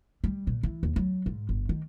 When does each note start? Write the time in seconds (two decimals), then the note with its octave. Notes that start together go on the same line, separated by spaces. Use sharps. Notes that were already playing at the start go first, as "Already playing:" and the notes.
0.24 G3
0.47 A#2
0.63 E3
0.83 D#2
0.96 F#3
1.26 G#2
1.49 G1
1.69 D#3